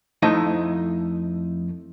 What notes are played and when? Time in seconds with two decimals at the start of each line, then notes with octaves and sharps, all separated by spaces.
0.22 F2 A3 D#4 E4 D#5